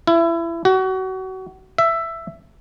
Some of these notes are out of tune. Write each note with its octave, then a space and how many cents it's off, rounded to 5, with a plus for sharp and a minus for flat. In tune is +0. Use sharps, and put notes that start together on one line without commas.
E4 +25
F#4 +30
E5 +10